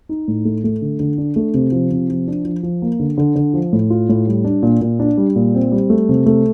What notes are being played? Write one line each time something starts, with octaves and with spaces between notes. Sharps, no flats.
D#4
A2
A3
A3
D3
D3
D4
A3
C3
F3
C3
F3
D4
F3
F3
A#3
D3
D3
D3
F3
A2
F4
A2
G3
D4
A#2
A#2
D4
G3
A#2
C4
G3
A3
C3
A3